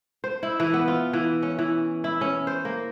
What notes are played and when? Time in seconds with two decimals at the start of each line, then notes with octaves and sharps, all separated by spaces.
0.24 C5
0.43 E4
0.60 E3
0.74 B3
0.88 F4
1.13 E3
1.42 C#4
1.59 E3
2.04 E4
2.21 C#4
2.47 C5
2.65 A#3